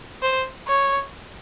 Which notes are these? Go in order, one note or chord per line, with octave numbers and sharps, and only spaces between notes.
C5
C#5